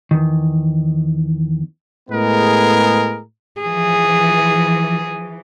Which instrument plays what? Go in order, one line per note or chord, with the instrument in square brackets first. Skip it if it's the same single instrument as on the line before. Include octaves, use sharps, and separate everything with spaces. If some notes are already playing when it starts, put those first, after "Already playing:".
[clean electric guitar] E2 D#3
[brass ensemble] A2 G#3 B3 G#4 A#4
[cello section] E3 F3 [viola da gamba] G#4